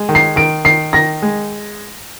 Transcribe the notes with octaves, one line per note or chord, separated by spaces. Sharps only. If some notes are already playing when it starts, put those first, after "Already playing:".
Already playing: G#3
D#3
C7
D#3 D7
D#3 C7
D#3 A#6
G#3